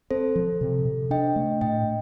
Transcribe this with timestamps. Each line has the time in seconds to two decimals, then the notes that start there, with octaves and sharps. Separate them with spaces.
0.11 C4 A4 C5
0.36 F3
0.61 C3
0.85 C3
1.10 D4 D#5 G5
1.36 A3
1.61 A2 D#5 G5